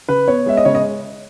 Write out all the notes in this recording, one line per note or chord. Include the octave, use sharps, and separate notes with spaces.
C#3 B4
B3 C#5
G#3 E5
D#5
C#3 C#5
D#5